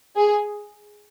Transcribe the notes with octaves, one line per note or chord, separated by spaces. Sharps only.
G#4